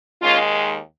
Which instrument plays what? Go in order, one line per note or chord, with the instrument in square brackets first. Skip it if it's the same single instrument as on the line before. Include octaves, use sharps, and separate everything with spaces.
[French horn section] D#2 D#3 G#3 C#4 F4